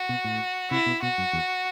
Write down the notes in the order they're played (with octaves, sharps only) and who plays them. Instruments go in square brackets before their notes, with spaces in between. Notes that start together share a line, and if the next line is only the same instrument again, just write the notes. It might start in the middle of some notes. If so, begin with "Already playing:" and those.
Already playing: [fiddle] F#4
[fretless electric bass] B2
A2
[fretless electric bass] C3 [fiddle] E4
[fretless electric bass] B2
[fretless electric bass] B2 [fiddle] F#4
[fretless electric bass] F#2
E2